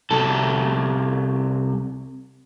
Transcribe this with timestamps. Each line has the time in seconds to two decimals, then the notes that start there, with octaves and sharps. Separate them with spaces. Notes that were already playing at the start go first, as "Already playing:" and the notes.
0.11 C2 A4